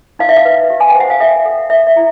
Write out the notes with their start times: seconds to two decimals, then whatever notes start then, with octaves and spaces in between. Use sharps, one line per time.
0.19 D#4 F5
0.29 E5
0.36 F5
0.45 B4
0.70 G4
0.80 G#5
0.90 G5
0.95 C5
1.00 F#5
1.10 F5
1.20 A4 E5
1.46 A4
1.70 A4 E5
1.87 E5
1.96 E4